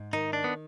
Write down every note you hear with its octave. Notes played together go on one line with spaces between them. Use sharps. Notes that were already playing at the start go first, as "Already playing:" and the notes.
Already playing: G#2
D#3 D#4
D4
B3